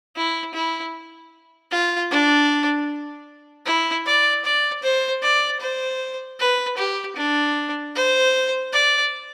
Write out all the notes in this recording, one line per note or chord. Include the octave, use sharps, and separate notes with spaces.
E4
E4
F4
D4
E4
D5
D5
C5
D5
C5
B4
G4
D4
C5
D5